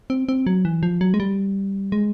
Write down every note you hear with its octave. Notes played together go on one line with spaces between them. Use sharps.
C4
C4
F#3
E3
F3
F#3
G#3
G3
G#3